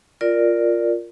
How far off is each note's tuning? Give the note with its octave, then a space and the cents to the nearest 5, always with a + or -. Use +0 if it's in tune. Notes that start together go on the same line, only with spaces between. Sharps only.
F4 +0 A#4 +0 D5 +0